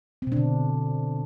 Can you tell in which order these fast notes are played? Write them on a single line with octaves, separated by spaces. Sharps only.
C4 B2 D4 D3